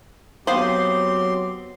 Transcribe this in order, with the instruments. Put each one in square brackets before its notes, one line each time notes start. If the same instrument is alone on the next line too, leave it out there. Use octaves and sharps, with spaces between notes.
[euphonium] F#3 [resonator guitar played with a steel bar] B3 F5 [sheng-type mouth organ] C4 G4 C6 [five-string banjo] C5